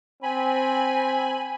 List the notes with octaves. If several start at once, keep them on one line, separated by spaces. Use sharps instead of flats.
C4 G#5 B5